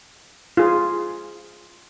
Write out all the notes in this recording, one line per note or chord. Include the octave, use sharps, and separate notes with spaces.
F4 G#4